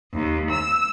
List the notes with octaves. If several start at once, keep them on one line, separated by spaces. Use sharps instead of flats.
D#2
E6